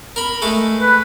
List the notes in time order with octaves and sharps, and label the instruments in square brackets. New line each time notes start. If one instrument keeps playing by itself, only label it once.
[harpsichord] A#4 B5
G#3 A3 A4
[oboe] B4